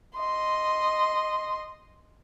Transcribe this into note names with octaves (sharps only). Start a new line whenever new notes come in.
D#5 C6